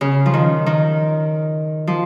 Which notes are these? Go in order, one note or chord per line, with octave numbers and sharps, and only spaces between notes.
C#3
F3
D#3
D#3
F3